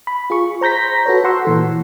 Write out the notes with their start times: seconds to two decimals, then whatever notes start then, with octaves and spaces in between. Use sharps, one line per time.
0.07 B5
0.30 F4 G#4 C#6
0.61 C5 A#5 G6 A#6 B6
1.06 F#4 A4 B4 C#5
1.24 A4 F#5 C6 C#6 E6
1.45 A#2 E3 A4